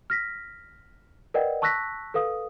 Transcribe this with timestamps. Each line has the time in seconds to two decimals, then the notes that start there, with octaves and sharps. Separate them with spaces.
0.10 F6 A#6 B6
1.34 A#4 B4 D5 D#5 F#5 G5
1.62 A5 C#6 E6 F#6 A#6 B6
2.14 A4 B4 F5 D#6